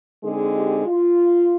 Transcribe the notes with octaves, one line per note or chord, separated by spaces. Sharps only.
D3 G#3 C4 D#4 G#4
G4
F4